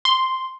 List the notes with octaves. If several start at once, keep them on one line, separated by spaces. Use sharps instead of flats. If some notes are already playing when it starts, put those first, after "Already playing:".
C6